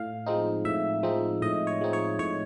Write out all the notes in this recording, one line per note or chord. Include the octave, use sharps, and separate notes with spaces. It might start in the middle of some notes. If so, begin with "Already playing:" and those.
Already playing: A2 F5
F3 G#3 C4 D#4
A2 E5
F3 G#3 C4 D#4
A2 D#5
C#5
F3 G#3 C4 D#4
C#5
A2 C#5